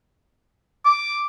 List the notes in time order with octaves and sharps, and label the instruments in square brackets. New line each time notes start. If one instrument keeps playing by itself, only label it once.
[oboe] D6